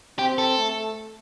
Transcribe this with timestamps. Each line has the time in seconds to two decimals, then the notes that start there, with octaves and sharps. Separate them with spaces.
0.19 C4 G4
0.38 A4
0.58 A3